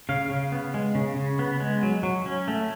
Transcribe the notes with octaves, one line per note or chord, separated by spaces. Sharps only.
C#3 F5
C#3
B3
G#3
C#3
C#3
B3
G#3
F#3
F#3
C#4
A3